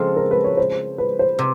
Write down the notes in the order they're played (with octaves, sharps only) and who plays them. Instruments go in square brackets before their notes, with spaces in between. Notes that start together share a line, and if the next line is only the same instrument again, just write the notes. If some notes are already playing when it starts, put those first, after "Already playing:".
Already playing: [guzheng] C#3 F3 G#3 C4 [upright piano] A4
[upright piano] A#4
B4
C#5
C5
B4
C5
[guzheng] C3